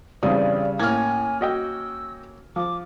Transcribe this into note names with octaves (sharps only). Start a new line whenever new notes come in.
E2 G2 C#3 G3 C4 D5 D#6
A2 A#3 C#4 G#5 F6 G#6
F#4 D#5 G5 E6
F3 D6